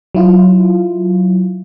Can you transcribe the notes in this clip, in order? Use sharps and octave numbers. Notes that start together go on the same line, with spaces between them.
F#3 E4 F4